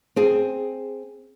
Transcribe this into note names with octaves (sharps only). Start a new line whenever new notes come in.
C4 G#4